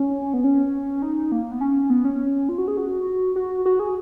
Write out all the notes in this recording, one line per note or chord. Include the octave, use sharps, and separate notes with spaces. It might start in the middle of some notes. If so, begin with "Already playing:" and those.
Already playing: C#4
B3
C#4
D#4
A#3
B3
C#4
B3
C#4
F4
F#4
G#4
F#4
F#4
F#4
G#4